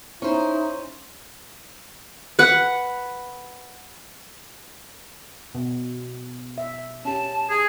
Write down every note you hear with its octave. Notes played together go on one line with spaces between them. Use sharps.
C#4 D#4 E4 C5
B4 F#5
B2
E5
C#4 G4 A5
G#4